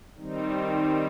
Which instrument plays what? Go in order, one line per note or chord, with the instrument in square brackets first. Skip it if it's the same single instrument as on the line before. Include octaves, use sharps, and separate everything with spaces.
[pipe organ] D#3 G3 C4 D#4